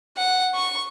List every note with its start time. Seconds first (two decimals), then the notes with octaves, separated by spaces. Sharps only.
0.17 F#5
0.55 C#6